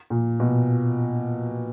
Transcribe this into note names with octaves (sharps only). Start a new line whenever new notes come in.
A#2
B2